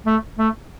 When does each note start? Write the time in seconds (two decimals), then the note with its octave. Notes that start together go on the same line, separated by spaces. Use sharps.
0.07 A3
0.39 A3